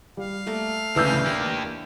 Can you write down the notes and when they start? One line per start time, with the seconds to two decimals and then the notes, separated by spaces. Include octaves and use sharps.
0.17 G3 F5
0.47 A3 A#3 A4
0.96 D2 C#3 E3 D4 B4 E6 G6
1.26 A#3 G4